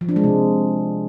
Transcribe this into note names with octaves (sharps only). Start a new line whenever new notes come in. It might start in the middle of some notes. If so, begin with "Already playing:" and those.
F3
D4
G#3
C3